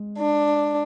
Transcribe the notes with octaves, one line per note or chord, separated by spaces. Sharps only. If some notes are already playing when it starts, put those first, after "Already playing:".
Already playing: G#3
D4